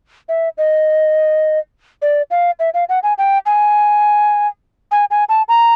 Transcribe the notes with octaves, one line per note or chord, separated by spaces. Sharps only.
E5
D#5
D5
F5
E5
F5
F#5
G#5
G5
G#5
G#5
G#5
A5
A#5